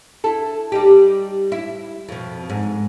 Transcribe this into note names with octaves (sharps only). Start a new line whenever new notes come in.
E4 A4
G3 D#4 G4
E4
F2 B2
G#2